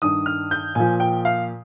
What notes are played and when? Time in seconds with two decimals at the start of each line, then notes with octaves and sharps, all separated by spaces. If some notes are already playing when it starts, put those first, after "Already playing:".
0.02 G2 D#3 D#6
0.26 F6
0.51 G6
0.75 A#2 F3 G#5
1.00 G5
1.25 F5